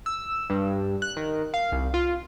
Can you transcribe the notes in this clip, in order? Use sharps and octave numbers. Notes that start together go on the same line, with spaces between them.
E6
G2
F#6
D#3
F5
C2
F4